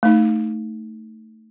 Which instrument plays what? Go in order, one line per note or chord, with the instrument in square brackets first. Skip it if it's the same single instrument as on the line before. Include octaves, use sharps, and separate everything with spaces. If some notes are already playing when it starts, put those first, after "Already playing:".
[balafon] A3 D#4